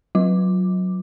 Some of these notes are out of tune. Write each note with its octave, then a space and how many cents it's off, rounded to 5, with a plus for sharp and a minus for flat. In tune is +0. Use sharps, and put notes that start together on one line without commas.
F#3 +0 F4 +0 D6 +5